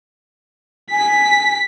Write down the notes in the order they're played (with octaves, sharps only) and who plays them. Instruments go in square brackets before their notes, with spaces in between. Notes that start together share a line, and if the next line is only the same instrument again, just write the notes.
[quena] G#5 [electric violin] B6